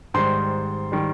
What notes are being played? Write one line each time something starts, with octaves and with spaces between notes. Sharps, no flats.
G#2 D#3 G3 C5 C6
D#3 G3